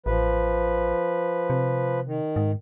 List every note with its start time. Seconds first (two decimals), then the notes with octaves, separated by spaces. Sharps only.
0.06 A1 F3 B4
1.50 C3
2.06 D#3
2.36 G#2